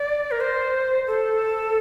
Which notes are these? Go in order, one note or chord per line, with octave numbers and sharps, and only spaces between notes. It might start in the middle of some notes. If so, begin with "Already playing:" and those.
Already playing: D5
A#4
C5
A4